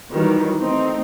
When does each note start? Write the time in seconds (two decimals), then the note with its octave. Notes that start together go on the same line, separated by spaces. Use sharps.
0.11 D#3 E3 F#3 G3
0.58 A3 C4 D#4